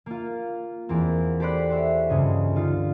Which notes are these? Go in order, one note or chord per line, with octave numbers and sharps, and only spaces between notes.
A#3 F4
E2 A#3 C4
G4 A4 C5 D5 B5 F#6
C5 C#5 E5
C#2 G2 C#3 D#5
D3 D#4 F4